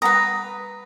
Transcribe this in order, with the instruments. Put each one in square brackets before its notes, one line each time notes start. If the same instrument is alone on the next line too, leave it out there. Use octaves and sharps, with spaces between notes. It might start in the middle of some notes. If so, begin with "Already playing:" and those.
[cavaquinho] B4 A#5 [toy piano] F#5 G5 D#6